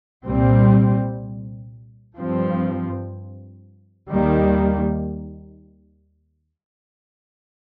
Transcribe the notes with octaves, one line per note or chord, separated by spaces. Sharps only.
C2 A#2 G3 C4
G2 F3 C4
D#2 D#3 G3 A#3